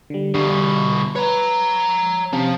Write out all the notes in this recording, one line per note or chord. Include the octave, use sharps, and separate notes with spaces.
D3 G3
E2 B2 D3 G3
B4 C#5 A#5
C3 F3 C4 C#4